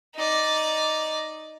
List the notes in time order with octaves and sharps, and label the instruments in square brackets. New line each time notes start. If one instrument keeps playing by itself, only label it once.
[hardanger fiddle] D#4 D5